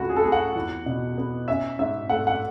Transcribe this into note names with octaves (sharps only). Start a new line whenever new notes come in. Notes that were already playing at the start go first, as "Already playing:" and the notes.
Already playing: C#2 A3 F#4
G#4
A4
A3 G#4
F#5
E2
B2
B3
C#4 E5
G#2 E5
A3 F#5
F#5